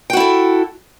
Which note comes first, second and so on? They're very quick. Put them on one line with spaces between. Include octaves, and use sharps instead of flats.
G5 F#4 E4 A4